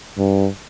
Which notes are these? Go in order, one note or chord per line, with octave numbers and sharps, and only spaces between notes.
G2